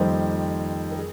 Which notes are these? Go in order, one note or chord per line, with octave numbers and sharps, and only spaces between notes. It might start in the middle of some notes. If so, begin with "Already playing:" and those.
Already playing: F2 D#3 G3 A#3 C5 D#5
A#4
G#4